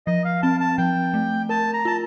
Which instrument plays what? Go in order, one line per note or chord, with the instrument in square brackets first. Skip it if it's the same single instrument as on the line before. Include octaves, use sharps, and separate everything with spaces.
[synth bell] F3 [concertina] D#5
[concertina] F5
[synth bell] C4 [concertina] A5
[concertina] A5
[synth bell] F3 [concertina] G5
[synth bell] A3
[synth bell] A#4 [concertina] A5
[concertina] A#5
[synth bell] F4 [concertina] A5